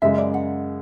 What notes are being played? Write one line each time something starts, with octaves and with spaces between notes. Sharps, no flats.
F#2 C#3 G#3 E5
D5
F#5